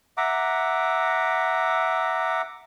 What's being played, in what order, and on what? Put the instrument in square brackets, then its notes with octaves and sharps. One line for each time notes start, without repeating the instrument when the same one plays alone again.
[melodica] E5 F#5 A#5 D6